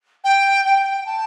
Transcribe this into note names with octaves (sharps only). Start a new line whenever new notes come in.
G5
G5
A5